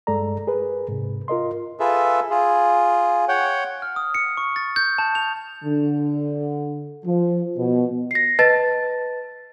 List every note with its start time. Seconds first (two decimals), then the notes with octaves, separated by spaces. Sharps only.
0.07 G2 G#3 A4 D5 A#5
0.47 G#4 A#4 B4
0.89 G#2 C3
1.28 F4 A#4 D#5 C6
1.80 F4 G#4 A4 B4 E5
2.30 F4 G#4
3.28 C#5 F#5 G5
3.82 F6
3.96 D#6
4.14 C#7
4.37 C#6
4.56 A6
4.76 G6
4.98 A5
5.15 F7
5.64 D3
7.05 F3
7.57 B2
8.11 A#6 C7
8.39 B4 D#5 A5 A6